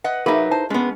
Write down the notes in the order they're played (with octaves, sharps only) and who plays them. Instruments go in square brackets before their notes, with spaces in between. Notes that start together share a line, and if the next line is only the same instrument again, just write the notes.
[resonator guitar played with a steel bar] B4 D#5 F#5
[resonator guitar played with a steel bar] F#3 E5 [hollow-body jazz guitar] D#4 B4 [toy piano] G#4 A#4 F5
[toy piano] E4 A5 [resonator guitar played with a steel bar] C5
[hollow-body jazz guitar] G#3 B3 [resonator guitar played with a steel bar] C#4 [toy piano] D#5